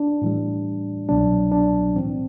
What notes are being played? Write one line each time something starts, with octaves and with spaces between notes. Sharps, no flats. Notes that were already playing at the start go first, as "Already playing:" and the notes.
Already playing: D4
A2 E3 G3
C2 B2 F#3 D4
D4
A2 E3 G3 C4